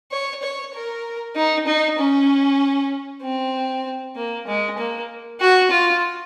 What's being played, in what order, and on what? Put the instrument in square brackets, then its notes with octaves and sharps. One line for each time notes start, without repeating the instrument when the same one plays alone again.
[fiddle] C#5
C#5
A#4
D#4
D#4
C#4
C4
A#3
G#3
A#3
F#4
F4